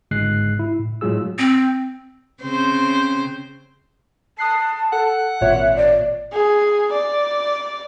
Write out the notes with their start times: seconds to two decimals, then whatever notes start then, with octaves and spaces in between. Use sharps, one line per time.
0.11 G1 G#2 C#3 G#3 F#6 C7
0.59 E4
0.79 A2
1.01 A2 F#3 G#3 F4 G#4 E6
1.39 C4
2.43 C#3 C4 C5
4.38 A5 D#6 F#6 C7
4.92 A4 F#5
5.41 G#1 A#2 C#5 E5
5.76 D5
6.33 G#4
6.92 D5